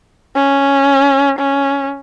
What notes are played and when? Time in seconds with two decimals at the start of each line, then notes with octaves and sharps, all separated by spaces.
0.35 C#4
1.39 C#4